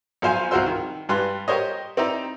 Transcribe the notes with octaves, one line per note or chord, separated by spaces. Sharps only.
B1 F3 C5 F5 G#5
C2 F3 F4 F#4 C5 E6
D#3
G2 G3 B4 C6 F#6
G4 A#4 C5 C#5 D#5
C4 D#4 E4 D5 A#5